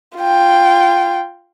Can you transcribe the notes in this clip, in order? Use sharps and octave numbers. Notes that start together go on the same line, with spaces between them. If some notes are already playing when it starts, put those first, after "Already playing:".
F4 G5